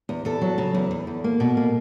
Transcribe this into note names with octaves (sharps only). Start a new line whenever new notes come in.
E2
E2 A4
F#3
C#3
E2
E2
E2
A#3
B2
A#3